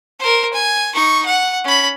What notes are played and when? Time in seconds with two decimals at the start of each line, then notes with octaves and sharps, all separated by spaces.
0.19 A#4 C5
0.53 G#5
0.94 D#4 C#6
1.25 F#5
1.64 C#4 B5